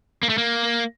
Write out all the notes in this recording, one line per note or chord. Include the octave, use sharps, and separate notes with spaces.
A#3
A3
A#3